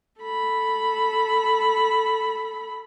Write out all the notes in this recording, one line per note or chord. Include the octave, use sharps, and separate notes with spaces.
A4 B5